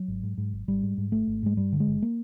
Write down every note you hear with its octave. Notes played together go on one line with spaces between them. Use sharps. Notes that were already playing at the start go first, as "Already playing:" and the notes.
Already playing: F#3
G#1
G#2
G#2
G#1
G#1 G3
G#2
G#2
G#1 A3
G#1
G#2 G#3
G2 G3
D3
G#3
G1
A#3